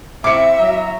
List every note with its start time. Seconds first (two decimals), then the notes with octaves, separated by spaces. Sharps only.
0.24 C4 E4 E5 F5 D6 C#7
0.59 F#3 A#5